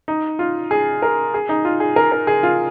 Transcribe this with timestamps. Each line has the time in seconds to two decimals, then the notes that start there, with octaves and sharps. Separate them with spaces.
0.08 D#4
0.39 F4
0.71 G#4
1.02 A#4
1.34 G#4
1.49 D#4
1.65 F4
1.80 G#4
1.96 A#4
2.12 A#4
2.27 G#4
2.43 F4